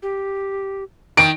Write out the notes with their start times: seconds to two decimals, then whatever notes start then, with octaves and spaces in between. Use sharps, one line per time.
0.02 G4
1.17 D#3 D7